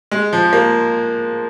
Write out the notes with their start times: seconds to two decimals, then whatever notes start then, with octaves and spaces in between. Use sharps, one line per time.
0.11 G#3
0.33 F3
0.53 A#3